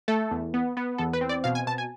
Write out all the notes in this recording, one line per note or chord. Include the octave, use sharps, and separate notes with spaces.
A3 A4
E2
B3
B3
E2 A4
B4
C4
D5
B2 F5
G#5
B2 A5
G#5